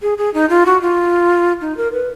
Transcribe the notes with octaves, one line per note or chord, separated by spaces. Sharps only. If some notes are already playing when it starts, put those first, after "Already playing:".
G#4
G#4
D#4
F4
F#4
F4
D#4
A#4
B4